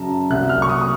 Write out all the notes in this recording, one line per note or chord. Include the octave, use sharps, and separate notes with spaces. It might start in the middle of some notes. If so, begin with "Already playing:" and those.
Already playing: F#2 C#3 F#3 A5 A#5
C2 C3 F#3 F#6
F6
C#6
D#6